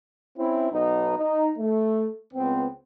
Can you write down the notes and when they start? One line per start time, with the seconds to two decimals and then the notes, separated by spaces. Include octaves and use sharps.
0.38 C4 C#4 E4
0.71 B1 B3 D#4
1.17 D#4
1.58 A3
2.33 C#2 B3 C4